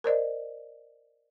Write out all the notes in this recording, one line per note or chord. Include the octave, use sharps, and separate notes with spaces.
A#4 C5 D5 D#5